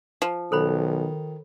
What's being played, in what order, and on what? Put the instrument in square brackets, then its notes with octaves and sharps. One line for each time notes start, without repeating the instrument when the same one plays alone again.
[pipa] F3
[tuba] B1 [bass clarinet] D#3 [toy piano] A4 C5 B5